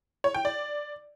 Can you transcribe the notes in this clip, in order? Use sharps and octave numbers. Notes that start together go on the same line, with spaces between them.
C#5
G5
D5